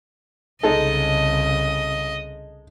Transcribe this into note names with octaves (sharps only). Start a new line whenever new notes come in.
C2 C#3 G#3 D#4 A4 D#5